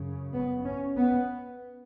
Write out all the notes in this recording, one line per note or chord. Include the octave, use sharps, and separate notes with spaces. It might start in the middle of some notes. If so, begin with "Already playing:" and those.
Already playing: F#2 C#3
B3
C#4
B3